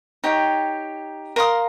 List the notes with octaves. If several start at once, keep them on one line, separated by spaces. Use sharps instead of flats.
D#4 G4 C#5 G5
A#4 F5 C6 D#6